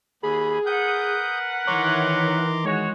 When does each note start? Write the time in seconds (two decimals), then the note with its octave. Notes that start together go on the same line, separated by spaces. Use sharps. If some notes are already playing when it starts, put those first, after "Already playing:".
0.23 D#2 G#4 B5
0.66 A#4 B4 F#5 D#6 G6
1.67 D#3 E3 C#5 A#5 C6 D6
2.65 G#3 F#4 C#5